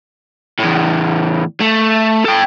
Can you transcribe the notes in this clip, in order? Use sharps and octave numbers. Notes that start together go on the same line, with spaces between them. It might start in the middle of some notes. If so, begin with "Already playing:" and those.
E2 A2
A3
A4 G5